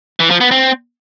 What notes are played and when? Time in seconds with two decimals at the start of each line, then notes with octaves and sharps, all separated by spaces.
0.20 E3
0.30 F3
0.41 B3
0.51 C4